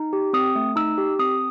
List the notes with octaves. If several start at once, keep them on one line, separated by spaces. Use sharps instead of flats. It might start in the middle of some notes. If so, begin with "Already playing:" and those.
Already playing: D#4
G4
C4 D#6
A3
D#4 E6
G4
C4 D#6